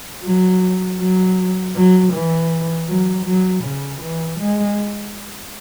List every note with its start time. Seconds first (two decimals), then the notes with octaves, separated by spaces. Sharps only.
0.24 F#3
0.99 F#3
1.75 F#3
2.13 E3
2.88 F#3
3.26 F#3
3.63 C#3
4.01 E3
4.39 G#3